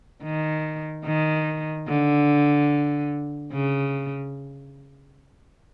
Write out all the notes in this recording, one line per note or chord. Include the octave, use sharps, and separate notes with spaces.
D#3
D#3
D3
C#3